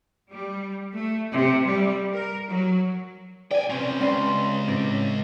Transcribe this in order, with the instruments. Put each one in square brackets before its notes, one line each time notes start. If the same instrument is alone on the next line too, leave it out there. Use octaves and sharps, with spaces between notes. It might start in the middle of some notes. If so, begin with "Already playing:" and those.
[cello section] G3
A3
C3
G3
A#4
F#3
[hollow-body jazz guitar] D5 [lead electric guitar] G5 G#5
[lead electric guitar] C3 C#4 [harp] C4 G4 B4
[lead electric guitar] C#2 [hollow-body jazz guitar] C4 C#4 D5 [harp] B4 G5 C6
[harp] A2 D5 A#6 [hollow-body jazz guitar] C4 C#4